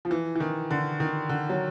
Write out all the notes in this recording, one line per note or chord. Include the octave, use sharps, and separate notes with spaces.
F3
E3
E3
D#3
D3
D#3
D3
F#3